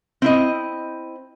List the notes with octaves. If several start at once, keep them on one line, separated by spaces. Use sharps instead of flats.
C4 E4 D#5